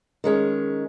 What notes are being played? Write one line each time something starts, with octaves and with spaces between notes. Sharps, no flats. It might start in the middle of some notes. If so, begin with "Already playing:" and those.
D#3 G#3 C#4